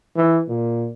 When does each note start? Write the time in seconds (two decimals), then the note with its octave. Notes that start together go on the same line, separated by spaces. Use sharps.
0.16 E3
0.48 A#2